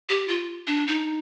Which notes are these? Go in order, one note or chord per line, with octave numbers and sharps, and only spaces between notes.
G4
F4
D4
D#4